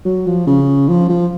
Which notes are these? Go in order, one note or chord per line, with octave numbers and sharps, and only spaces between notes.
F#3
F3
C#3
F3
F3